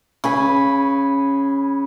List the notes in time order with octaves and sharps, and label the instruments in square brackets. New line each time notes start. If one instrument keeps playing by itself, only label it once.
[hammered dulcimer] C#3 G#5 B5